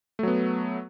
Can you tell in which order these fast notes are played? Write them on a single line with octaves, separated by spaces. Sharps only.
A3 F#3 B3